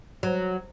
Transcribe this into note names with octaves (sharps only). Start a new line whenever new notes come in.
F#3